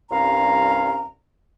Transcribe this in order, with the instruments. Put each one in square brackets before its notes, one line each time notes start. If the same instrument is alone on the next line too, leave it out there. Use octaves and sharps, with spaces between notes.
[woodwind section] C2 G2 C#4 F5 A#5